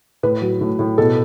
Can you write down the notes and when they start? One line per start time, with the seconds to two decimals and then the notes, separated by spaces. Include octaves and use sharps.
0.23 A2 B4
0.42 F#3
0.61 A2
0.79 A2
0.98 B2 A4